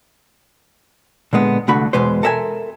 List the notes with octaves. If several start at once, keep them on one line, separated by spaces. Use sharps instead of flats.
A#2 D3 G#3 B3
C2 D3 A3 F#4 B5
E2 B2 G#3 B4 C5
A4 A#4 E5 F#5 G#5